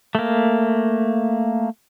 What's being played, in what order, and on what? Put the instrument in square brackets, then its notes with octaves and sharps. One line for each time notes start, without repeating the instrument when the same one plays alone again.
[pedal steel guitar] A3 A#3